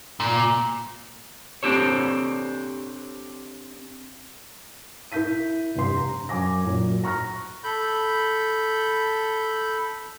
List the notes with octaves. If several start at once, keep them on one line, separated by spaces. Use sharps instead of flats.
A#2
C4 D4 G4 A4 C#5
E4 A#4 E5 G6 B6 D#7
F1 G2 C6
A#5
F#2 G#5 D6 A#6
F#2 A#2
A#5 C#6 F6 F#6 A#6
A4 B5 G6